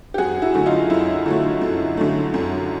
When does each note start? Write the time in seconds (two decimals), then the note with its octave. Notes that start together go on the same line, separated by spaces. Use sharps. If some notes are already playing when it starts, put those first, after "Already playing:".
0.14 G4
0.18 F#2 F#4 G#4
0.42 E4 F#4
0.54 D3 F#3 A3
0.66 D#4 F4
0.90 F#2 E4
1.26 D3 F#3 A3
1.62 F#2
1.97 D3 F#3 A3
2.34 F#2